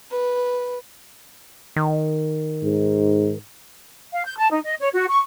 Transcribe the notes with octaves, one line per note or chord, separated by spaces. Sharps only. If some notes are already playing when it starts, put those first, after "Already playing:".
B4
D#3
G#2
F5
G6
A5
D#4
D#5
C#5
F#4
C#6